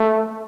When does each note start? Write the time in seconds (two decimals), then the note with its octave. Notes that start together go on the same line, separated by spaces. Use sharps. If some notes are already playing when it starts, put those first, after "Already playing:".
Already playing: A3